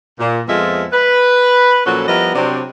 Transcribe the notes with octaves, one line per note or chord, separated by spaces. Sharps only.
A#2
F2 F3 G#3 B3 F4 E5
B4
A#2 F3 F#3 C#4 F#4 A4
F3 G3 B3 E4 A#4 D#5
C3 F#3 C4 D4